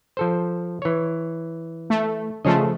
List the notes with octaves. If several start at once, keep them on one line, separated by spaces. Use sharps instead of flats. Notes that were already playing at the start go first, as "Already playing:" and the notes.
F3 A4 C5
E3 C#5
A3
C#3 F3 A3 G#4 C#5 D#5